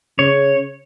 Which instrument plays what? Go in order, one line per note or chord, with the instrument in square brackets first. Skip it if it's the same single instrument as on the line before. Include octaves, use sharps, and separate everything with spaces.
[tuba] C#3 [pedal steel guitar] C#5